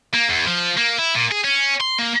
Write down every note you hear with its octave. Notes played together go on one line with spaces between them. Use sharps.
A#3
E2
F3
A#3
E4
A#2
G#4
C#4
C6
A#3